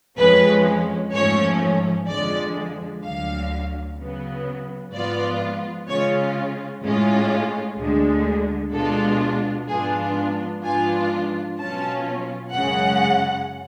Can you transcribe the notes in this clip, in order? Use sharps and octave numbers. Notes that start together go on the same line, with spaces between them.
F2 F3 G#3 C#4 B4
G#2 F3 A3 C#4 C#5
F2 D3 F3 G#3 D5
D2 D3 F#3 F5
C#3 F#3 B3
G#2 F3 B3 F4 D5
C#3 G#3 C#4 F4 C#5
A2 G#3 C#4 F4
D2 D3 G#3
B2 G#3 D4 F4 A4
G#2 F3 B3 D4 F4 G#4
G#2 F3 B3 D4 F4 G#5
B2 F#3 C#4 F4 A5
F#2 C#3 G#3 C#4 F#5